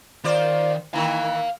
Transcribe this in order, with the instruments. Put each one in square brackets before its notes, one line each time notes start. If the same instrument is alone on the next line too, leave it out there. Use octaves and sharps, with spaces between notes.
[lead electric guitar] D#3 [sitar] F4 C5 D5
[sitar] D#3 E3 [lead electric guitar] F5 A#5